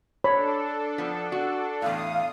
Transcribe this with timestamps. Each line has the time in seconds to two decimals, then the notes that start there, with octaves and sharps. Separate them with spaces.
0.24 D4 A4 C#5 B5
0.98 F3 B3
1.32 F#4
1.82 E2 A2 F5 D#6